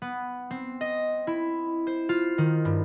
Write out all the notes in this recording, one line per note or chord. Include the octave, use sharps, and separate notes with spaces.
B3
C4
D#5
E4
C5
F4
D#3
G2